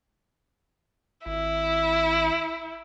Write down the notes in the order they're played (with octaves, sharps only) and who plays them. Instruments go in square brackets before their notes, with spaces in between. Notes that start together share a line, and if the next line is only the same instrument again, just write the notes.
[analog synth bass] G#1 [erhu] E4